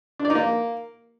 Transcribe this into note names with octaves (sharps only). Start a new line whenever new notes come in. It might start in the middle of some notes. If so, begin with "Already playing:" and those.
D4
D5
D#4
A#3